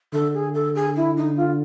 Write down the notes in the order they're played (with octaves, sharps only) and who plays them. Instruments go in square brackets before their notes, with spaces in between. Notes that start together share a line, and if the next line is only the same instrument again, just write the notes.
[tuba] D3 [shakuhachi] A4
[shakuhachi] G#4
A4
G#4
E4
D#4
F4